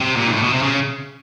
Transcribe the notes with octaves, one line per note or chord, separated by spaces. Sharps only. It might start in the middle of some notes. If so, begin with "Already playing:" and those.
C3
A#2
G#2
A2
B2
C3
C#3